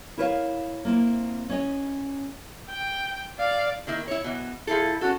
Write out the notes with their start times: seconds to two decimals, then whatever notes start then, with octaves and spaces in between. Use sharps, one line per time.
0.18 E4 A#4 B4 C#5 E5 F5
0.85 A#3 C4 E4
1.49 C#4 C#5 D#5
2.69 G5
3.39 D5 F5
3.87 D#3 A#3 E4
4.08 E4 C#5
4.24 B2 E3
4.67 F3 E4 G#4 A4
5.01 C#4 F#4 A4